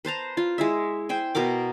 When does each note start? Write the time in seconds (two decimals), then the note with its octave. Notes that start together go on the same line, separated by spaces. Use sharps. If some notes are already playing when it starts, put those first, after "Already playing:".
0.05 B4 C5 A5 A#5
0.37 F4
0.58 G#3 E4 E5
1.09 C5 G5 G#5
1.35 B2 B3 A#4 D6